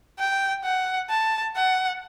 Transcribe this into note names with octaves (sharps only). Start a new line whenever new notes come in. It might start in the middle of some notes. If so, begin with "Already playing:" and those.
G5
F#5
A5
F#5